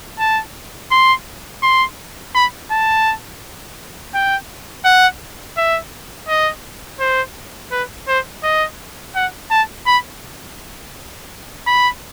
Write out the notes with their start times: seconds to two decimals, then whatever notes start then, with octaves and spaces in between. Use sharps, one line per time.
0.19 A5
0.91 C6
1.62 C6
2.35 B5
2.71 A5
4.14 G5
4.85 F#5
5.57 E5
6.28 D#5
7.00 C5
7.71 B4
8.08 C5
8.43 D#5
9.15 F#5
9.51 A5
9.86 B5
11.67 B5